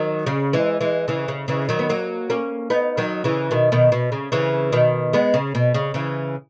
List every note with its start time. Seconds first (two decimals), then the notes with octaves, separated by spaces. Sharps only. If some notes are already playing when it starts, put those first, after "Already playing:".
Already playing: D#3 F#3
0.26 C#3
0.53 E3 G#3
0.81 E3 G#3
1.08 C#3 E3
1.28 C#3
1.48 C#3 E3
1.69 D#3 F#3
1.79 B3
1.89 F#3 A#3
2.30 A#3 C#4
2.70 B3 D#4
2.97 D#3 F#3
3.24 C#3 E3
3.51 B2 D#3
3.72 B2 D#3
3.92 B2
4.12 C#3
4.32 C#3 E3
4.72 B2 D#3
5.13 G#3 B3
5.34 C#3
5.55 B2
5.74 C#3
5.94 C#3 E3